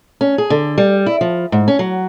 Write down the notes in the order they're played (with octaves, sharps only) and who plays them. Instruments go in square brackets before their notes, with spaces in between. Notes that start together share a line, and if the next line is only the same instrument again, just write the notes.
[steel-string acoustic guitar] C#4
G#4
D3
G3
E4
F3
G#2
C#4
F#3